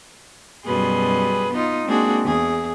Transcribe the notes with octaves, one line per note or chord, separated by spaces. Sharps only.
F#2 B2 G3 G#4 B4 C6
B3 D#4 F4
G#3 A#3 C4 D4 F#4 G#4
E2 G#4